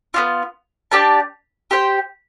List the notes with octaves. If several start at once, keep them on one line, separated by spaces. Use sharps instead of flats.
B3 D4 F4
D4 G4 D5 A5
G4 C5 G5